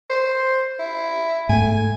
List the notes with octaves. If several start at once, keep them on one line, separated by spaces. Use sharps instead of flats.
C5
E4
G#2 A3 G#5